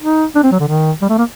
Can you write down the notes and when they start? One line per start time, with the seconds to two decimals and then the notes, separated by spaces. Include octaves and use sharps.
0.02 D#4
0.35 D4
0.44 C4
0.52 F#3
0.60 D3
0.68 D#3
1.02 G3
1.09 A3
1.18 A#3